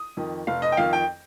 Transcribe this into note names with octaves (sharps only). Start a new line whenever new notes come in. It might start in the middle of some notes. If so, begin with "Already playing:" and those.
Already playing: D#6
F2 D#3
F1 F5
D#5
G5
F2 D#3 F5
G5